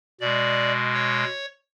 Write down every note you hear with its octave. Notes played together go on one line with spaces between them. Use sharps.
B2 G#3 D5
C#5